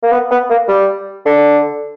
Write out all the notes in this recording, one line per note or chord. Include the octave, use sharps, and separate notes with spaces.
A#3
B3
B3
A#3
G3
D3